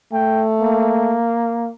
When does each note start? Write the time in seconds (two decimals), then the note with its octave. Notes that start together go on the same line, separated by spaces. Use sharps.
0.13 A3 G5
0.61 A#3